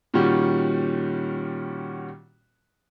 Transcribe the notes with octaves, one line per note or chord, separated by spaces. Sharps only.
A#2 D#3 G3 C#4 F#4